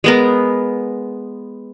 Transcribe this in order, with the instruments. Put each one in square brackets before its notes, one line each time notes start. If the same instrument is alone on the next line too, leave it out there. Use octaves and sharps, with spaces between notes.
[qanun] G#3 B3 A#4